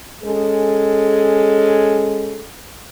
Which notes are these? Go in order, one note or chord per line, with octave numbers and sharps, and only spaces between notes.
G#3 C#4 G#4 A4